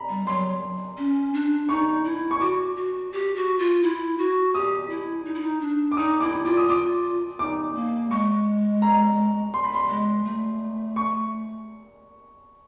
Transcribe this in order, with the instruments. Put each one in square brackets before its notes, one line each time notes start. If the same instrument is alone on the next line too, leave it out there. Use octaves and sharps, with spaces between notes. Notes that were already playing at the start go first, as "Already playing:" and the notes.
Already playing: [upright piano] A#5 B5
[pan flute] G3
[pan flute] F#3 [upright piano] C6
[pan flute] C#4
D4
[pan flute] D#4 [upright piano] C#6
[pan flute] E4
[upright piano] C#6
[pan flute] F#4 [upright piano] D6
[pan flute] F#4
G4
F#4
F4
E4
F#4
[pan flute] G4 [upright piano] D#6
[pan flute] E4
D#4
E4
D#4
D4
[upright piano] D6
[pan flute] D#4 [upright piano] D#6
[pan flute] E4 [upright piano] D6
[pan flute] F4 [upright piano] D6
[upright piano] D#6
[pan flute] F4 [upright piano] D6
[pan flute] D#4 [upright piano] D6
[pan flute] A#3
[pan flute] G#3 [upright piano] C#6
[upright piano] A#5
C6
B5
C6
[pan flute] G#3
A3
[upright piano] C#6